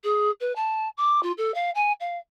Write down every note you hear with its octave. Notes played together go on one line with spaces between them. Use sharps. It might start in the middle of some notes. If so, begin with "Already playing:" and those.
G#4
B4
A5
D6
F4
A4
F5
G#5
F5